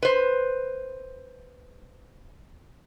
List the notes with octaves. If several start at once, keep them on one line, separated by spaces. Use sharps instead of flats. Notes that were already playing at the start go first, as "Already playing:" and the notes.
B4 C5